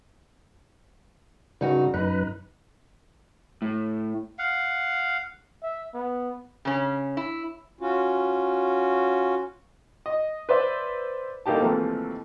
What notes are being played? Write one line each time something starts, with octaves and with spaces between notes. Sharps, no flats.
G2 C#3 D#4 F#4
F#2 D#4 B4
A2
F5 F#5
E5
B3
C#3 C#4
E4
C#4 F4 F#4
D#5
B4 C5 D5 E5
C2 D3 A#3 D#4 G4 A5
D#2 C3 E3 F3 G#3 A3